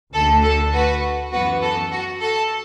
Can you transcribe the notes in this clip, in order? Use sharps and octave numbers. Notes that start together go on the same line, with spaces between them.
D2 D3 A3 A4
A4
F#4 B4
F#2 E3 B3 F#4 B4
A4
F#4
A4